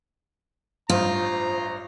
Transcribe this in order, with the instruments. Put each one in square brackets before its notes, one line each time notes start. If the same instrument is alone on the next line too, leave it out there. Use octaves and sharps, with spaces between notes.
[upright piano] A1 G2 D#6 [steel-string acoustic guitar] F4 [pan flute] C5 [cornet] A#5